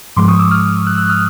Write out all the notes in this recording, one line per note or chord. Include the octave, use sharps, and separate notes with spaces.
G#2 F3 G#3 C6 D6
C#6 D#6
D6 E6
D#6 F6
E6 F#6
E6 F#6
D#6 F6